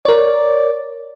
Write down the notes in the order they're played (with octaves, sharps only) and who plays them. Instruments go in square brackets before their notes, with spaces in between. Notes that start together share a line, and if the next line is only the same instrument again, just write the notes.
[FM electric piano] A#4 C#5 [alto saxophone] D5